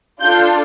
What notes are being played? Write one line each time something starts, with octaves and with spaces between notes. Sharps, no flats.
D4 F4 A4 G6